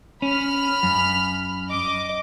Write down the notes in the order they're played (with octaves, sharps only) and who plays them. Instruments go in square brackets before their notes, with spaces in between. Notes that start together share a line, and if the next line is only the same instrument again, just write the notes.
[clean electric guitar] C#4 [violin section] B5 F6
[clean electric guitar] F#2
[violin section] D#5 D6